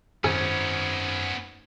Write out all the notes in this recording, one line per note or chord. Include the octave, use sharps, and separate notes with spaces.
G#1 F#2 B3 C#4